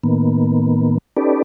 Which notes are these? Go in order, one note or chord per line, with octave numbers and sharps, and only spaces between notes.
A2 D#3 A#3 B3
C#4 D#4 G4 A4 B4 D5